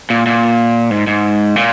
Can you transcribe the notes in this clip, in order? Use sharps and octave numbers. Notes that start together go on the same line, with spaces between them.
A#2
A#2
G#2
G#2
A#2